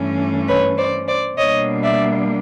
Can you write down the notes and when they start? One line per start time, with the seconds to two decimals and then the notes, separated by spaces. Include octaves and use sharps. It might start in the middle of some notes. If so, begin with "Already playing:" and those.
Already playing: G2 E3 A3 C#4
0.48 B4 C#5
0.77 C5 D5
1.08 C5 D5
1.37 B2 G3 A#3 D4 C#5 D#5
1.83 D5 E5